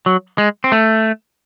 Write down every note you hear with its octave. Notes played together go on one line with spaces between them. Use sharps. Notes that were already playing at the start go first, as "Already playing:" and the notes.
F#3
G#3
C4
A3